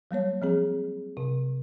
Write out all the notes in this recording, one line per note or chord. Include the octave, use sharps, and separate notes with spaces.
F#3 G3 A#3 C#5
F3 C4 G#4
C3